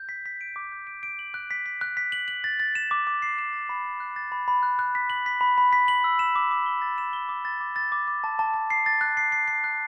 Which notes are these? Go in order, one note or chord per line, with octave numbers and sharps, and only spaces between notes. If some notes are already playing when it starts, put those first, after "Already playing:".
Already playing: G6
B6
B6
D7
D6
G6
D7
D7
F#7
F#6
B6
B6
F#6
B6
F#7
F#7
A6
A6
E7
D6
D6
C7
E7
A6
B5
B5
F#6
A6
B5
B5
F#6
F#6
B6
F#7
B6
B5
B5
B6
F#7
E6
E7
D6
D6
G7
A6
E7
G7
D6
A6
D6
A6
D6
D6
A5
A5
A5
C7
A6
F#6
C7
C7
C7
F#6